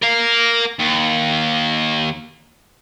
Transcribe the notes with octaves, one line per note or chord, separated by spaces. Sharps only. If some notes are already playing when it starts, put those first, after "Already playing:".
A#4 F5
D#2